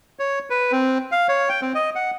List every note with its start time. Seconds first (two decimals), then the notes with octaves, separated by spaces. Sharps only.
0.19 C#5
0.50 B4
0.72 C4
1.12 F5
1.29 C#5
1.49 G5
1.62 C4
1.75 D#5
1.95 F#5